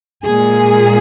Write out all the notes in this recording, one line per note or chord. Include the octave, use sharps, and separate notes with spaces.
A#2 G#3 G#4